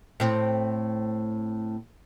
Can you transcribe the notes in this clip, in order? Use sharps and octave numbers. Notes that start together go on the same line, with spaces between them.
A2 C4